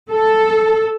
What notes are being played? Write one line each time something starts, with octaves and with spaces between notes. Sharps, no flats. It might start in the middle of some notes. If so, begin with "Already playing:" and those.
A4